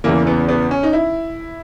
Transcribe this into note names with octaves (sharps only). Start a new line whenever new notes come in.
E2 C#3 E3 A#3
B3
B3
C#4
D#4
E4